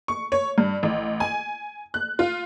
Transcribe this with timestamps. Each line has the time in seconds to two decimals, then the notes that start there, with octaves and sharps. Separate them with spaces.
0.08 C#6
0.32 C#5
0.58 G2
0.83 A1
1.20 G#5
1.94 F#6
2.19 F4